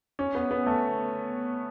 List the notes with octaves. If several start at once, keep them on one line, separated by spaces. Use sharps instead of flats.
C#4
B3
B3
A3